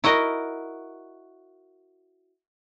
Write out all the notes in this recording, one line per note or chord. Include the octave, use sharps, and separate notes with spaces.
E4 F#4 A#4 D#5